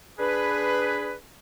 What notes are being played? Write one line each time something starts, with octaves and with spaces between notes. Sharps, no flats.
D4 G#4 B4